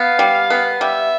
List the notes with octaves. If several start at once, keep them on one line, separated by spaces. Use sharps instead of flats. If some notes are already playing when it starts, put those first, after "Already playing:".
Already playing: B3 F5
G3
B3
G3 E5